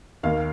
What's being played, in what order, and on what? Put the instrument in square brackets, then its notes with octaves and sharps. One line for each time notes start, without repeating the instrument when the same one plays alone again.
[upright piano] D#2 D#3 A#3 F5